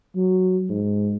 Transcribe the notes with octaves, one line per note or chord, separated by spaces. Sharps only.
F#3
G#2